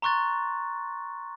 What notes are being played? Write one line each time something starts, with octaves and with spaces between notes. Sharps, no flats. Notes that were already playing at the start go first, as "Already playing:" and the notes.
A#5 C6 C#6 F#6 A6